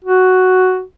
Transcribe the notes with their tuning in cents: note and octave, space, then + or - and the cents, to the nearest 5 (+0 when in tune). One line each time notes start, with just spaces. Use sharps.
F#4 +5